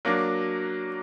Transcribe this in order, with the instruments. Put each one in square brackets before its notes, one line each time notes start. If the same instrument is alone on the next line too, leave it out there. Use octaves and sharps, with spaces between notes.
[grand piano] F#3 A#3 D4